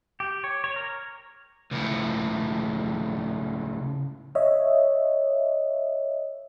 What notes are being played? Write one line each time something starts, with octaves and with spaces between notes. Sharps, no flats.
G4
C#5
C#5
A#4
C#2 A2
C#5 D#5 E5